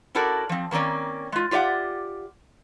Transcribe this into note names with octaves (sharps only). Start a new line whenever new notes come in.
C#4 E4 F#4 A4 A#4 D5
F3 C4
D#3 A#3 C4 C#4 D5
G#3 F4
F4 G4 D5 E5 F#5